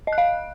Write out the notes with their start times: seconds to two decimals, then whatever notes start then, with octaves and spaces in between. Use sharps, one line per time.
0.07 D#5
0.13 F#6
0.18 F5